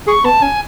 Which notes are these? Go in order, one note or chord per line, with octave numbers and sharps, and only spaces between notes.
G#4 C#6
B3 A5
C#4 G#5